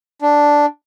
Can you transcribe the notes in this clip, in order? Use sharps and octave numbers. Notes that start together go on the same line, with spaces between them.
D4